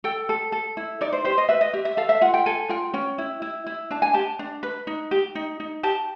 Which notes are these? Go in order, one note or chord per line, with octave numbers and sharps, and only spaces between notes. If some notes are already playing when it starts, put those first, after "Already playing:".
A4 G5
A4
A4
E4
D#4 D5
C5
G4 C5
D#5
B4 E5
D#5
G4 E5
E5
A4 F5
E5
F4 F#5
G5
A4 G#5
F4 G5
C#4 G5
E4
E4
E4
D4 A5
G#5
G4 A5
D4
B4
D#4
G4
D#4
D#4
G4 A5